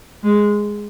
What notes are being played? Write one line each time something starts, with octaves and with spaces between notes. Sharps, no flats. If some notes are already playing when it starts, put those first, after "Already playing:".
G#3